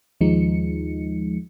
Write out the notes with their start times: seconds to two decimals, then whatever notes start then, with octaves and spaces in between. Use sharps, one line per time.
0.21 D#2 F3 G#3 D#4 C#7